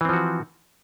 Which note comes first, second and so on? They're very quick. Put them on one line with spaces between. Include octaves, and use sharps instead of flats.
E3 C4 F3 F#4